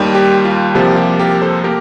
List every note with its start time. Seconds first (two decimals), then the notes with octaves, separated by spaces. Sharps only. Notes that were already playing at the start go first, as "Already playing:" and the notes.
Already playing: D#2 D#3 G3
0.15 G4
0.45 F4
0.75 C2 C3 F3 A#3 G4
0.91 F4
0.97 G4
1.19 G4 A#4
1.42 A4 C5
1.64 A#3 G4 A#4